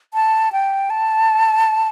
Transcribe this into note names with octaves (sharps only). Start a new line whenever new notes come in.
A5
G5
A5